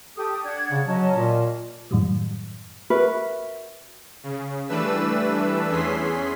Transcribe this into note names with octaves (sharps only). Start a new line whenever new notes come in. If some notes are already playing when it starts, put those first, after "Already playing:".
G4 A4 D#6
D4 F#5 G#6
C#3
F#3 C#4 D#5 A5
A#2
F#2 A2 D#3 F#3 G3
F#4 A#4 B4 E5
C#3
E3 G3 A3 D4 B4 E6
E2 E3 C#4 G#4 C6 B6